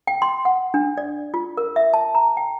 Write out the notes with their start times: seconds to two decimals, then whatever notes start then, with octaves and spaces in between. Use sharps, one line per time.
0.07 G5
0.22 C6
0.45 F#5
0.74 D4
0.98 D5
1.34 F4
1.57 A#4
1.76 E5
1.94 A5
2.15 A#5
2.37 G5